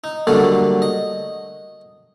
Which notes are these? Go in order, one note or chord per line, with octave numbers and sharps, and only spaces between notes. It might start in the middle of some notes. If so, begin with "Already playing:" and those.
D#4
D3 F#3 G3 A3 A#3 D4
D#5